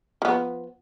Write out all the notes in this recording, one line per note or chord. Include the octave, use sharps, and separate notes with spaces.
F3 B3